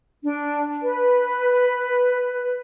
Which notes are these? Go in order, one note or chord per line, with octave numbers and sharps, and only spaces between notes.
D4
B4